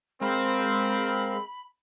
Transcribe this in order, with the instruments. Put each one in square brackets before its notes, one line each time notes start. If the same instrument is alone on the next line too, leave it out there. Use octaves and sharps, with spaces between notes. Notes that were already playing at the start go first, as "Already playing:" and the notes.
[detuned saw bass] G#3 [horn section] C4 [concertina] A#4 F5 [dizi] B5